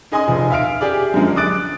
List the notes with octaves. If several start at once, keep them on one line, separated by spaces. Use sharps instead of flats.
D#4 G#4 D#5 G#5 C6 D#6
F1 F3
E5 F5 F6 D7
G4 G#4 D5
F#2 D3 F3 G#3
D6 D#6 F#6 A6 D7